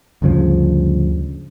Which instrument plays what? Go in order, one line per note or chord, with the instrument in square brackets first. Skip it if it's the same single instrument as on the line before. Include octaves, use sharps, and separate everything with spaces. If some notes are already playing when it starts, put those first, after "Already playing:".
[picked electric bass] D2 G2 C#3 F3